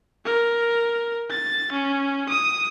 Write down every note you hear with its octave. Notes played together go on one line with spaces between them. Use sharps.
A#4
A6
C#4
D#6